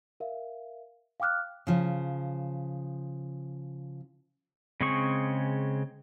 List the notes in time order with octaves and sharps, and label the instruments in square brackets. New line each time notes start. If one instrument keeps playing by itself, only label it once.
[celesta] A#4 E5 F5
F5 G5 D6 F6 F#6
[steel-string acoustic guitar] C#3 F3
[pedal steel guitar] C#3 G#3 C4 G#4 C#6